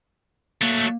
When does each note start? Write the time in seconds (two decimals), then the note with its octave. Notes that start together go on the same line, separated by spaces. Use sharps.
0.61 F#3 A3 A#3